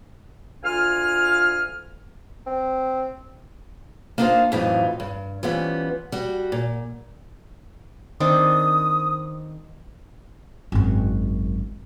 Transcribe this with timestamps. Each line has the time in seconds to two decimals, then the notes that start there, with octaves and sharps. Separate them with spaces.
0.64 D2 F4 F5 G#5 F6
2.46 C4
4.18 A#3 B3 D4 D#4 F4 C5
4.52 F2 A2 E3 F#3 D#4 F4
5.00 G2
5.43 E3 F3 G3 B3 C#4
6.12 G3 F#4
6.52 A#2
8.20 D#3 C4 D4 D#6
10.72 G#1 F#2